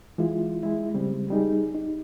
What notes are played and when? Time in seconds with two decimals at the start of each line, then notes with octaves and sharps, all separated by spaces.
0.18 E3 G#3 E4 F4
0.63 G#3 E4
0.94 C#3 G3 G#3 C4
1.31 G3 D#4 G#4
1.74 D#4